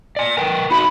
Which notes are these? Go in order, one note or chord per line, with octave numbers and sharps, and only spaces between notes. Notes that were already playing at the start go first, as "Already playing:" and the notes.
D5 G#5
A#4 B4 G5
D#4 F#4 B5